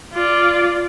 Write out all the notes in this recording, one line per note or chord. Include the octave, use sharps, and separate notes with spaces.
F4 D5